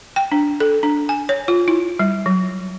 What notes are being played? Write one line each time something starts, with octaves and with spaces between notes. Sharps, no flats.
G5
D4
A4
D4
G#5
C#5
F4
E4
G3
F#3